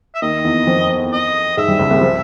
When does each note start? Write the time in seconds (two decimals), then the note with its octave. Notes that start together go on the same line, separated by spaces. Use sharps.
0.14 E5
0.22 D#2 D#3 D#5
0.44 E2 E3
0.67 F2 F3
1.12 D#5
1.57 G#2 G#3 E5
1.68 G2 G3
1.79 C#2 C#3
1.91 C2 C3
2.01 F3